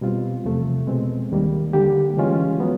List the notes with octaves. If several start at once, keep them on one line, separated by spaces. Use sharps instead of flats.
B2 G3 C4 F4
E2 C3 F3 A3
B2 G#3 C4
D#2 D#3 G3 A#3
D3 G3 A#3 D4 G4
C#3 E3 G#3 C#4 F4
F#3 B3